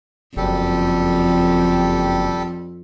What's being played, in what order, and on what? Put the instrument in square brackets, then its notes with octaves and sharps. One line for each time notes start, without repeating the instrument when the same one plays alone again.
[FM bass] F#1 [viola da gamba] F2 [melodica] G3 G4 A4